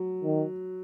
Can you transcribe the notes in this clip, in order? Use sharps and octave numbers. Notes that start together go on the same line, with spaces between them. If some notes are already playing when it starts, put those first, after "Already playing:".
Already playing: F#3
D#3